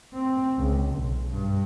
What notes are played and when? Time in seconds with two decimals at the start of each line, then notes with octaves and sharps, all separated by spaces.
0.14 C4
0.58 C#2
0.94 B1
1.31 G2